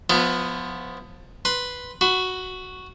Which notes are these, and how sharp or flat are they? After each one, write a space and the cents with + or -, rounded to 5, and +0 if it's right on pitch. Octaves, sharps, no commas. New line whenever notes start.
F3 +25 B3 +5 E4 +35
B4 +0 C6 +0
F#4 +0 B5 +25